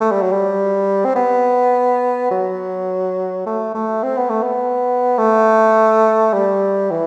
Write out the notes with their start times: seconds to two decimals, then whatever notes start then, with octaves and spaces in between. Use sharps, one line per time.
0.01 A3
0.11 G3
0.22 F#3
0.33 G3
1.05 C4
1.16 B3
2.31 F#3
3.46 A3
3.75 A3
4.03 C4
4.17 B3
4.30 A3
4.43 B3
5.18 A3
6.34 G3
6.91 E3